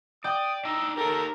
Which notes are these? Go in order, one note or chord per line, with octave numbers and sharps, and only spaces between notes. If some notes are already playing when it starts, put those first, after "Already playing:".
D5 G5 D#6
D4 D#4 D#5 E6
D#4 G4 A4 A#4